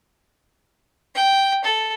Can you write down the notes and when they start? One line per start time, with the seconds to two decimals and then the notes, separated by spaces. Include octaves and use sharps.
1.15 G5
1.64 A4